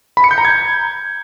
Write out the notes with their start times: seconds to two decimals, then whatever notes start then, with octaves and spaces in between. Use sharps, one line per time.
0.17 B5
0.24 C#7
0.31 G6
0.38 A#5
0.45 G#6